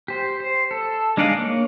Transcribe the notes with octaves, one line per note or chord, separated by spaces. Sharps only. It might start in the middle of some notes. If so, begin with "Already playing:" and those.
G4 C5
C5
A4
G#3 D4 D#4 D5 F5
A#3 C#5